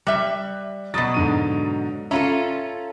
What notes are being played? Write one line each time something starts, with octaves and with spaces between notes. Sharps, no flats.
G3 E5 F#6
B2 F#3 B5 D#6 A6
G#2 D3 D#7
C#4 F4 A4 E5 A#5